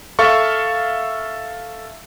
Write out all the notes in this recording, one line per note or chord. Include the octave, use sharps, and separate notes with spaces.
A4 E5 F5 C#6